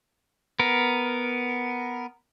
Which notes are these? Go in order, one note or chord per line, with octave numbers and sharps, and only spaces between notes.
B3 A#4